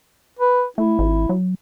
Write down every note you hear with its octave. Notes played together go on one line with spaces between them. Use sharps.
B4
A3 E4
G#1
F#3